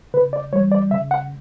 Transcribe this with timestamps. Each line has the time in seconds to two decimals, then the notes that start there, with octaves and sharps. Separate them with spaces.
0.14 C#3 B4
0.33 D5
0.52 E3 G3 C#5
0.72 D5
0.91 C#3 E5
1.11 F#5